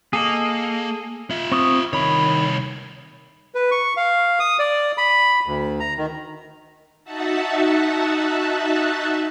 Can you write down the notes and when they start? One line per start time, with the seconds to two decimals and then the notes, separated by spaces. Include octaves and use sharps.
0.13 A#3 G#4 A4 D#5
1.30 F4 E5
1.52 C4 C#6 D#6
1.93 C2 D#3 C#5 B5
3.55 B4
3.71 C#6
3.97 F5
4.40 D#6
4.59 D5
4.98 B5
5.46 D2
5.80 A#5
5.98 D#3
7.04 D#4 F#4 E5 F#5 A5